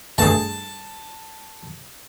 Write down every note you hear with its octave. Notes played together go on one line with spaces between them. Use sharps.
G2 A3 G#4 A5